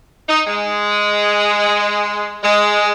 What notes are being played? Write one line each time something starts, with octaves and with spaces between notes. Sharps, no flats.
D#4
G#3
G#3